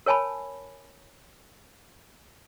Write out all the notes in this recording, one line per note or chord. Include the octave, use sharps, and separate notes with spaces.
A#4 C#5 G#5 A5 B5